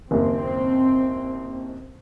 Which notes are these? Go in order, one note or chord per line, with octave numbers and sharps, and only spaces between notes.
F#1 D#2 C4